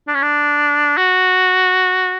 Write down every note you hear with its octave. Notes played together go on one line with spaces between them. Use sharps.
D4
C#4
D4
F#4